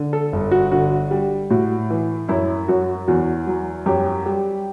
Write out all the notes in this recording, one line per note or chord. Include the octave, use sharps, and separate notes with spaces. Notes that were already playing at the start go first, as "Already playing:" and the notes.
Already playing: D3
A4
G1
F#4
D3 F#4
G3
A2 F#4
E3
F#2 E4
F#2 F#4
E2 F#4
F#3
F#2 G4
G3